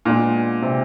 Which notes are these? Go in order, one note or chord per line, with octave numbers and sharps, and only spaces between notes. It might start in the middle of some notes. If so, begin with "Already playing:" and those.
A#2 G#3 B3 D4 F4
C3